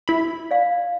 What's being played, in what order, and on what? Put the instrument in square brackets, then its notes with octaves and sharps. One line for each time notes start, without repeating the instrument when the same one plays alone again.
[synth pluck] E4 B5
[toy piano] D5 F5